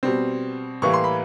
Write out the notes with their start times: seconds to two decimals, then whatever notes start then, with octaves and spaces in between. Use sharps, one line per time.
0.03 B2 G3 C4
0.82 A2 E3 G3 A#3 C#6
0.93 C6
1.04 B5